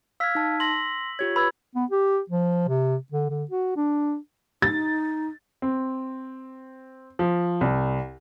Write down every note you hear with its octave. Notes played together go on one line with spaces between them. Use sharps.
F5 E6 F6 G#6 B6
D#4 A5
C6 A#6 F#7
F4 G4 C#5 G#6
B4 B5 E6 G#6
B3
G4
F3
C3
D3
D3
F#4
D4
D#4 A6
C4
F3
C2